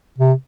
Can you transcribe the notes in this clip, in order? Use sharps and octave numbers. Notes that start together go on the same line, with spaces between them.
C3